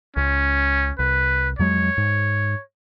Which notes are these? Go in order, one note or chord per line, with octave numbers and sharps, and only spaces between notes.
C#2 C#4
C2 B4
F2 F#3 G#3 C#5
G#2